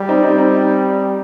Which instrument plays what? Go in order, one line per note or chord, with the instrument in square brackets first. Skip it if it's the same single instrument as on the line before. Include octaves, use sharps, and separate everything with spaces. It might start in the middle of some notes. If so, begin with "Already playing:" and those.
Already playing: [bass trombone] G3
[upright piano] C4 D#4
C4 D#4
C4 D#4